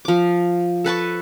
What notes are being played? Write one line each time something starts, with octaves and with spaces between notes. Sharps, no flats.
F3 D6
A4 B4 A5 C#6